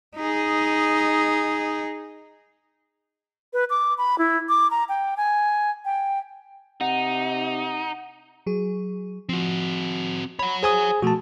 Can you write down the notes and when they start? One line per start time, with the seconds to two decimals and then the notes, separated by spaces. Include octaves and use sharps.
0.17 D#4 G#4
3.53 B4
3.70 D6
3.98 B5
4.18 E4
4.49 D6
4.71 A#5
4.89 G5
5.17 G#5
5.85 G5
6.81 C3 D#4 F#5
8.46 F#3 G#4
9.29 F3 C4 F#4
10.39 C#5 F#5 B5
10.63 G#4 C5 G#5 D#6
11.02 B2 F3 A3 F#4 A5